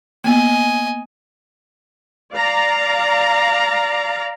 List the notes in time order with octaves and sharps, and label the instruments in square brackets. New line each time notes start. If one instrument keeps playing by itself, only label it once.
[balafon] A#3 B3 [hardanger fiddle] D#5 G#5
[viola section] D5 F5 A#5